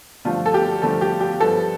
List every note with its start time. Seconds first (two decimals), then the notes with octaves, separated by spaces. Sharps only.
0.25 G2 D3 F3 A3 F4
0.46 A4
0.54 G4
0.82 G2 D3 F3 A3 A4
1.01 G4
1.20 G4
1.40 G2 F3 B3 A4